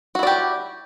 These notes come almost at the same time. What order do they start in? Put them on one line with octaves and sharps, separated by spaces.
F#4 E4 D5 G4